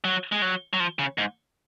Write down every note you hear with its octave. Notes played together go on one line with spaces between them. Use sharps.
F#3
G#3
F#3
F#3
F3
C#3
G#2